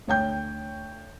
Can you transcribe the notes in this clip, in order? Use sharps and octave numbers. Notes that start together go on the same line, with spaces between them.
D2 C#5 G5 G6